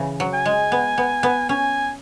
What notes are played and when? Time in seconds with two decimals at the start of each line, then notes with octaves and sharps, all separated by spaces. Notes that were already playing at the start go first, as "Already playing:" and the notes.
Already playing: C#3 E3
0.20 F#3
0.34 G#5
0.46 G#3
0.72 B3
0.98 B3
1.23 B3
1.49 C#4 G#5